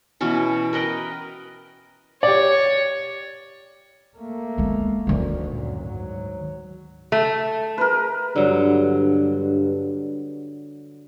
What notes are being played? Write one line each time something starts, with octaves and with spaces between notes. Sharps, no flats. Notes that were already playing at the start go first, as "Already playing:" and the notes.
B2 E3 C#4 C#6
A#4 B4 D#5 G5
G4 C#5 D5
A3 A#3
G#3 B3
D2 D#3 A3
F#2 A#2
G#2 F#3
A3
A#4 B4
G2 D3 F#3